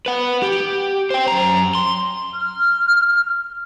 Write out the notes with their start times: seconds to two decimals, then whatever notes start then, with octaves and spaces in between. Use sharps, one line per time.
0.06 B4 F#5
0.43 G4
1.10 C5 G5
1.28 F#2 A#5
1.75 C6
2.32 F6